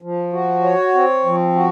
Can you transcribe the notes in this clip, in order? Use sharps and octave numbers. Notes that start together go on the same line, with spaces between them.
F3
F#4
C#5
C4
F3
F#4